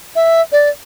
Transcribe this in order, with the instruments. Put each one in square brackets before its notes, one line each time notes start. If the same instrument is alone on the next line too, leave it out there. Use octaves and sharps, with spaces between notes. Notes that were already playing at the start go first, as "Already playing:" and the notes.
[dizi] E5
D5